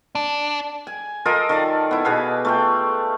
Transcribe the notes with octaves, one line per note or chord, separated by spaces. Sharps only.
D4
G#5
F4 A4 A#4 D#5
D#3 A4 D5
B3 E4
B2 G#4 B4 F5
A3 F4 G5